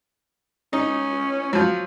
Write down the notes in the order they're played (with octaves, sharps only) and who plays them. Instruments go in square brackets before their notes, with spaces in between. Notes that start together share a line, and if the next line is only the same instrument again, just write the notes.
[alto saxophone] C#4 [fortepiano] D#4
[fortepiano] F3 F#3